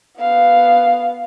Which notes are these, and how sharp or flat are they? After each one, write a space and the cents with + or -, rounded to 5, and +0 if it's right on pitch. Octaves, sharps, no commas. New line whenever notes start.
B3 +0 F5 +0